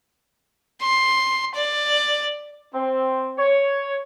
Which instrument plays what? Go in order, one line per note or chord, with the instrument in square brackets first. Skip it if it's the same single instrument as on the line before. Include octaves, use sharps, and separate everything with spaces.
[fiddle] C6
D5
[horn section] C4
C#5